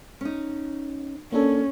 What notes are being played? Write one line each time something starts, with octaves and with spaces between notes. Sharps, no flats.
C#4 D#4
A#3 C#4 D4 A4